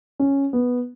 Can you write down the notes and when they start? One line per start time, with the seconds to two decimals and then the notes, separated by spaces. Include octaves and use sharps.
0.19 C#4
0.53 B3